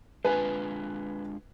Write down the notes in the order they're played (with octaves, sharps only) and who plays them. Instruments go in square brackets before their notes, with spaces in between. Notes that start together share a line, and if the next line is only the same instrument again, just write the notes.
[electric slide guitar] G#3 D4 F4 [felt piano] B4 G#5